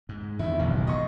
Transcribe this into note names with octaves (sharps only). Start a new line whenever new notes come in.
G#2
E2 G#2 D#3 E4
F#1 B1 E2 D#3
G#2 D#5 C#6